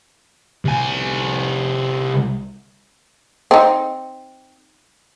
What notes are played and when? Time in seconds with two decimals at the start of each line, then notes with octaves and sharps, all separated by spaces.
0.65 C2 G#5
3.51 C4 D#4